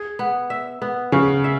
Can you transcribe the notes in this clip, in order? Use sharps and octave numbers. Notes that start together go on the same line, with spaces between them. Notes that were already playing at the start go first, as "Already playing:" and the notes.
Already playing: G#4
B3
E5
B3
C#3 F#4
E5